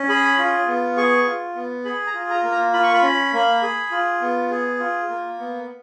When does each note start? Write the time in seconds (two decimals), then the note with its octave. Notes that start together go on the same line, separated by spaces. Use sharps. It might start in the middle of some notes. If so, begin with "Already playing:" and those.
Already playing: C#4
0.09 G#4 B5
0.39 F4
0.68 B3
0.97 G#4 C#6
1.26 F4
1.55 B3
1.85 G#4 B5
2.07 A#5
2.14 F4
2.30 A#5
2.44 A#3
2.51 A#5
2.74 F4 B5
2.83 C#6
2.94 B5
3.03 C#4
3.33 A#3
3.63 G#4
3.91 F4
4.21 B3
4.50 G#4
4.79 F4
5.10 A#3
5.39 B3